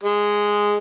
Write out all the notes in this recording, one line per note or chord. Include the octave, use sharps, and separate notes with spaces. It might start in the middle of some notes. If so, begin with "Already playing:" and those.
G#3